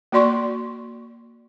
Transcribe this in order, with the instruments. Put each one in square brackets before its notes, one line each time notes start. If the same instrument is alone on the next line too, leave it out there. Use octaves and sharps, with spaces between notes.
[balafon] A#3 F#4 D5 C6 C#6